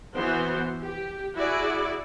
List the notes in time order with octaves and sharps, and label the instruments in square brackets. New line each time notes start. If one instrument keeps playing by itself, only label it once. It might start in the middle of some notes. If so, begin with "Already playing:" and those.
[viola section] E3 B3 F#4 C5
G4
E4 F#4 G#4 D5